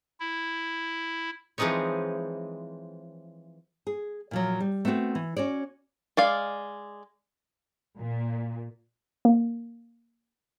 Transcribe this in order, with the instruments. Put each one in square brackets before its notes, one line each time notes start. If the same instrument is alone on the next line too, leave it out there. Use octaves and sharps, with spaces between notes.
[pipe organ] E4
[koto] E3 F3 G#3 C4 D#4 C#5
[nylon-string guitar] G#4
A#2 F3 F#3
G3
A3 B3 C4 F4 F#4
E3
C#4 F#4 C#5 D5
[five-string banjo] G#3 D5 F5
[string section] A#2
[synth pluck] A#3